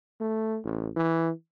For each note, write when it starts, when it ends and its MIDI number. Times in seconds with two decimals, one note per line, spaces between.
0.21 0.59 57
0.64 0.89 33
0.96 1.31 52